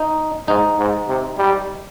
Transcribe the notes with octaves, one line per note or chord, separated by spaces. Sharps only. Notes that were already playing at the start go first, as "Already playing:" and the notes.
Already playing: D#4
G#2 D#4
G#2
C3
G3